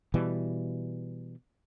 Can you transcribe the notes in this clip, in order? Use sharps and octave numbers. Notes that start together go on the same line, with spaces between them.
B2 E3 G3